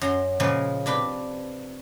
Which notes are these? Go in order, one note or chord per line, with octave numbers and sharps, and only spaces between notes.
F#2 F#3 A#5 C6
A#2 C#3 F3 G#3 A#3
C3 D4 B4 G5